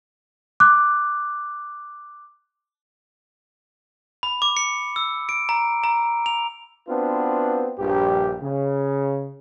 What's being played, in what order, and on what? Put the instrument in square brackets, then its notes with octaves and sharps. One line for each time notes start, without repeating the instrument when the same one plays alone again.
[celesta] D6 F#6
[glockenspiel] B5
D6
C#7
E6
D7
A#5
A#5
F7
[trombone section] B3 C4 D4 F4 F#4 B4
A#1 G2 G4
C#3